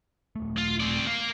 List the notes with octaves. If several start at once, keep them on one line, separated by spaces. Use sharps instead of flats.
D#1 A3
F4
C4 D5
A#4 F5